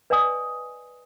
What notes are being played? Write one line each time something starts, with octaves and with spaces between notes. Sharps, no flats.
B4 D5 D#5 G#5 D#6